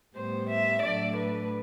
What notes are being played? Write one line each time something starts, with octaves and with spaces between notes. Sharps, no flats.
A2 G3 B3 C5
E5
A2 F#3 A3 D4 D5
B4